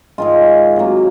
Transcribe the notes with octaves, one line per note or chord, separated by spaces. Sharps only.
G#2 D#3 G#3 F4
C3 F#3 A#3